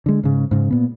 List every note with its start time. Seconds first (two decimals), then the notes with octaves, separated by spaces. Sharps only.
0.06 D3 G#3
0.23 G#2 C#3
0.51 G#2 C#3
0.71 A#2 B3